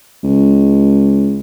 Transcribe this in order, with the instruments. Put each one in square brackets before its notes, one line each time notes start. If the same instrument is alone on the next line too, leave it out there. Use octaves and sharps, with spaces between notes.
[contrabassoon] C#2